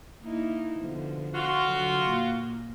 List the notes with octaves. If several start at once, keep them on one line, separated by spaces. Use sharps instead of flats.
A#3 D#4 E4
B2 D3 F3
F4 F#4
D3 F#3
A#2 A#3